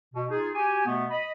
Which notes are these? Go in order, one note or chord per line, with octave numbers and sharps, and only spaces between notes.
B2
D#4 F4 G#4
F#4 G4 G#5
B2 A3 B3
D#5 B5